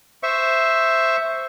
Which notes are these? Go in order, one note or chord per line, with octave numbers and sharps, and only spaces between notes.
C5 E5 C#6